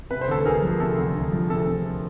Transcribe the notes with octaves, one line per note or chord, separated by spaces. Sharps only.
C3 B4
C5
D2 A4 B4
D2 G#4 A#4
F3
C3 A4
D2
D2
F3
C3 A4
D2